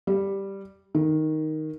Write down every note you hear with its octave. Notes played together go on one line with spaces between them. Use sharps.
G3
D#3